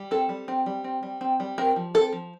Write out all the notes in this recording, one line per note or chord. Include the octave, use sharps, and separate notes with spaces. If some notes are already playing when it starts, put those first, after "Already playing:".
Already playing: G3
C4 A4
G3
C4
G3
C4
G3
C4
G3
C4 A#4
F3
C4 A4
F3